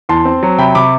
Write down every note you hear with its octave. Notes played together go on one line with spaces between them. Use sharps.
E2 A5 C6
C4
F#3
C3 G5 B5
C3 B5 D6